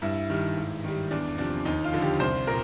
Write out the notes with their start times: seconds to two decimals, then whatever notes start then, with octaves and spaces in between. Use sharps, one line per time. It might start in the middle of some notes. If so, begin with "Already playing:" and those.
0.02 G2 E4
0.29 D#3 G3
0.57 G#2
0.84 D#3 G3
1.11 E2 D4
1.38 C3 F3 D4
1.65 D#2 D#4
1.84 F4
1.93 D3 F3
2.02 G4
2.20 C2 C5
2.47 A#2 A#4